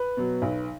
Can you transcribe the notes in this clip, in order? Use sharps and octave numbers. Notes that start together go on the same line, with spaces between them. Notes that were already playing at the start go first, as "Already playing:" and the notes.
Already playing: B4
B2 F#3
B1